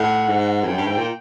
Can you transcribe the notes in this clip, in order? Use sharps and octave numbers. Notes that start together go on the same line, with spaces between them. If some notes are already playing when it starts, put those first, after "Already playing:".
Already playing: A2 F#5
G#2
F2
F#2 G5
G2
G#2
A#2